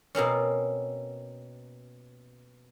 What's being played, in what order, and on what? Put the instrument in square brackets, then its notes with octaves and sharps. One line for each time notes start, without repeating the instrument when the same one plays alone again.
[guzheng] B2 A#3 C4 C#4